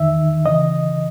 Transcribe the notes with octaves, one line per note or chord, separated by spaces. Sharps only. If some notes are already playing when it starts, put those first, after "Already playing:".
Already playing: E2 D#3 E5
C#3 E3 D#5